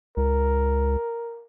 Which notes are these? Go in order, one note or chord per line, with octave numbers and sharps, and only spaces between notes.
C#2 A#4